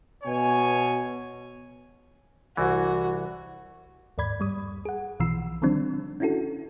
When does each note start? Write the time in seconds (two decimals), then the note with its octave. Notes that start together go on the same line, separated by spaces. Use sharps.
0.24 B2 C#5 G#5
2.57 C2 E3 F#4
4.18 D#2 G#2 D5 B5 G#6
4.40 G2 G3 D#6
4.85 G#4 F#5
5.20 B1 B2 E3 F3 E6 C7
5.62 D3 D#3 F3 G3 C4 D4
6.20 C#4 D4 E4 F#4 A4